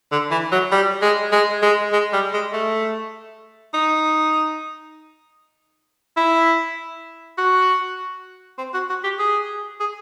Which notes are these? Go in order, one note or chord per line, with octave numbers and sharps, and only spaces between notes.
D3
E3
F#3
G3
G#3
G#3
G#3
G#3
G3
G#3
A3
D#4
E4
F#4
C4
F#4
F#4
G4
G#4
G#4